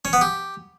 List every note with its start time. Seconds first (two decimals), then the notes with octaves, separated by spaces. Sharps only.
0.05 C#4
0.13 B3
0.21 G4